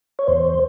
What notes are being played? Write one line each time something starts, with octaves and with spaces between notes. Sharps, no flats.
C#5
E2 C5